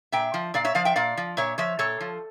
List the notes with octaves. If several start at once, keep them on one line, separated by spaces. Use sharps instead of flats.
A#2 E5 G5
F3
A#2 D5 F5
C#5 E5
F3 D5 F5
E5 G5
A#2 D5 F5
F3
A#2 C#5 E5
F3 C#5 E5
A#2 A4 C#5
F3